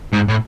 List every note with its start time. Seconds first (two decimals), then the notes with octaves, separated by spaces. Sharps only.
0.13 G#2
0.28 A2